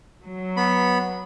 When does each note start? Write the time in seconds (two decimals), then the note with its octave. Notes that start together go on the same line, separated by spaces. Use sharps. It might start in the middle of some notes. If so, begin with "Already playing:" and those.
0.23 F#3
0.57 B3 B5